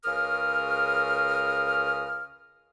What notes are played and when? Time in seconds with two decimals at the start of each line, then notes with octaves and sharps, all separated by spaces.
0.05 C#2 C#3 A#4 D#6 F6